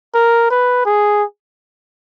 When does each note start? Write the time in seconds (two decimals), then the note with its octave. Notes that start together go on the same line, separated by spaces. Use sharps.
0.14 A#4
0.51 B4
0.86 G#4